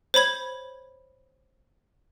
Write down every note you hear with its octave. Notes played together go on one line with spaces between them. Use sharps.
C5 C#5 B5 G#6